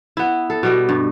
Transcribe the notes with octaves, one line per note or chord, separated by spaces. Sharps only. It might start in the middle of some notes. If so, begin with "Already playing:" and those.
B3 E4
A4
B2 G3 D#5
G2